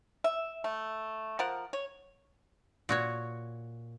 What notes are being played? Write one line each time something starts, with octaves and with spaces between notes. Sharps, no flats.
E5
A3
F3 A#4 F#5
C#5
A#2 F#4 C#5